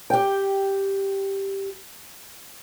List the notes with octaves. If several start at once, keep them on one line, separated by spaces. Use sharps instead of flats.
G4 G5